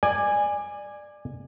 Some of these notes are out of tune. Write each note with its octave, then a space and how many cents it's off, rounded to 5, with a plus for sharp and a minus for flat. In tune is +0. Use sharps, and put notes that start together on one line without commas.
D5 +20 G#5 -10